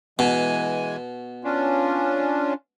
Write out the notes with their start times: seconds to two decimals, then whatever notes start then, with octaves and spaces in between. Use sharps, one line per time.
0.19 B2 E3 G#3 G#5
1.44 C#4 D4 F4